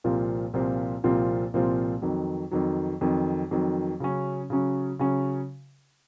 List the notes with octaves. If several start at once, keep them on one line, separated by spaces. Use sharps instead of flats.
C2 A#2 F3 C4 F4
C2 A#2 F3 C4 F4
C2 A#2 F3 C4 F4
C2 A#2 F3 C4 F4
F2 D#3 F#3
F2 D#3 F#3
F2 D#3 F#3
F2 D#3 F#3
C#3 F#3 C#4
C#3 F#3 C#4
C#3 F#3 C#4